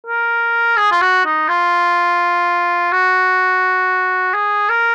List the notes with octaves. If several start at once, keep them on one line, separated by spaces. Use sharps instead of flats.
A#4
G#4
F4
F#4
D#4
F4
F#4
G#4
A#4